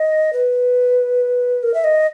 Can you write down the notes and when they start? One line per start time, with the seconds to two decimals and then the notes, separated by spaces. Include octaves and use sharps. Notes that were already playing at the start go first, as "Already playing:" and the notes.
Already playing: D#5
0.33 B4
1.63 A#4
1.74 E5
1.84 D#5